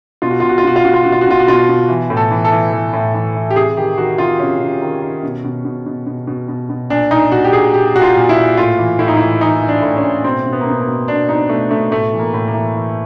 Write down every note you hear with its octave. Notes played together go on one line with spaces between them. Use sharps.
B2 F4
F#4
B2 F4
F#4
F4
B2 F#4
F4
B2 F#4
F4
B2 F#4
F4
F#4
B2 F4
F#4
B2 F4
B2
E3
A2
A4
E3
A4
E3
E3
A2
E3
E3
G4
C3 G#4
D#3 G4
D#3 F#4
C3 F4
C3 C#4
C3
D#3
D#3
B2
B2
B2
B2
B2
B2
B2
B2
A#2 D4
A#2 D#4
A#2 F#4
G4
A#2 G#4
A#2 G4
A#2 F#4
F4
A#2
E4
A#2
A2 F4
E3
A2 E4
D#4
E3 E4
E3 D#4
E3
D4
A2
C#4
A2
B2 C4
B2
B3
A#3
B2 B3
A#3
B2
B2 D4
B2 D#4
B2 A3
B2 A3
A2 A3
E3
A#3
A2
A#3
E3
E3